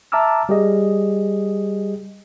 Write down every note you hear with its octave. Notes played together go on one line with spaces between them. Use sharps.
E5 A5 A#5 D6 E6 F6
G3 G4 G#4 D#5